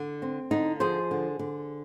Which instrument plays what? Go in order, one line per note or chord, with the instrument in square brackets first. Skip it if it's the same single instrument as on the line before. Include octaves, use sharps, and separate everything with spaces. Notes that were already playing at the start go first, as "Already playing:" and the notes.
Already playing: [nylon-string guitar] D3
C4
D3 D#4
F3 G#4 C5
D3
D3